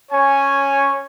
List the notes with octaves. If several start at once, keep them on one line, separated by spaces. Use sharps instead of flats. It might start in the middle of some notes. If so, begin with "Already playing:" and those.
C#4 C#5 G#5